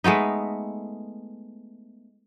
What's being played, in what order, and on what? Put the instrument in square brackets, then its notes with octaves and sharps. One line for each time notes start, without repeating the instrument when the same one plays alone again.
[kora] G#3 A3 B3 D#4